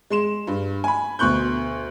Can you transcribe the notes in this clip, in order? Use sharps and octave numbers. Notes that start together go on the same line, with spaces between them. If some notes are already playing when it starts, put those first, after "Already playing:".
G#3 C6 E7
G2
G#5 B5
D2 B2 C#6 F#6 G6